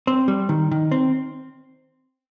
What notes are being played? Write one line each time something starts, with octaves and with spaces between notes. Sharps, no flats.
C4
G3
D#3
D#3
C4